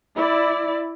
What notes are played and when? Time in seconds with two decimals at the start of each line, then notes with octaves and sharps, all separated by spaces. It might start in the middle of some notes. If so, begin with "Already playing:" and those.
0.15 E4 D5